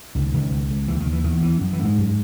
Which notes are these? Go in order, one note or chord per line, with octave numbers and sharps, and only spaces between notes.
C#2 D#3
C#2
C#2
C#2
D#2 E3
D#3
D#2
E3
E2 D#3
E2 E3
F#2
E3
F#2
G#2 G#3
F#2